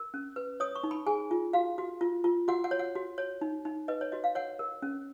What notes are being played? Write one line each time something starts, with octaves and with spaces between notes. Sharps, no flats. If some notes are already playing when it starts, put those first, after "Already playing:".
Already playing: A#4
C#4
B4
C#5 D#6
C#6
D#4
B5
G#4 G#5
F4
F#4 F5
F#4
F4
F4
F#4 F#5
F#5
C#5
F#5
F#4
C#5
D#4
D#4
B4 D#5
C#5
F#4 D#5
F5
C#5 F#5
A#4
C#4